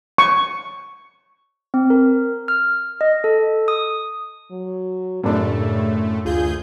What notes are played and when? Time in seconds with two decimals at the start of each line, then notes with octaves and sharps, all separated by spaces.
0.18 C#6
1.74 C4
1.90 A#4
2.48 F6
3.01 D#5
3.24 A4
3.68 D#6
4.51 F#3
5.24 F#2 A2 C#3 A3 D4 D5
6.25 D2 F4 G#4 G6